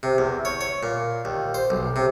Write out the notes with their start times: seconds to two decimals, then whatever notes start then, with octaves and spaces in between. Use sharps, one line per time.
0.03 C3
0.18 E2
0.45 C#5
0.61 C#5
0.83 A#2
1.25 D#2
1.54 C5
1.70 B1
1.96 C3